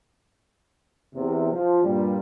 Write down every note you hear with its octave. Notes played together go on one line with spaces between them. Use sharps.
E2 C3
F3
G2 A#2 G3